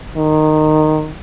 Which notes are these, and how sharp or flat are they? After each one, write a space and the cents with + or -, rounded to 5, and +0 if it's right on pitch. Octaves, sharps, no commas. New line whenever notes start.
D#3 -10